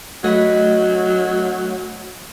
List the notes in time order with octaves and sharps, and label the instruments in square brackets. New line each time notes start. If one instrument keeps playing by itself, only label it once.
[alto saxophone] F#3 [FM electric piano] A3 [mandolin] D#5 F#5 B5